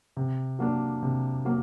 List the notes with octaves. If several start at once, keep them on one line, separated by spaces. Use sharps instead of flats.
C3
F#3 A#3 D4
C3
F#3 A#3